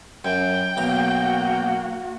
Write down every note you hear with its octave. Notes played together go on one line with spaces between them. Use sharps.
F#2 G5
B1 A#3 F#4 A#5